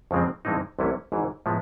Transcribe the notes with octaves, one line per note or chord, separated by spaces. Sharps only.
F2 C#3 F3 G#3 C4
G2 E3 G#3 C4 D#4
C2 C3 E3 A3 C#4
G#1 G#2 E3
A2 F3 G#3 B3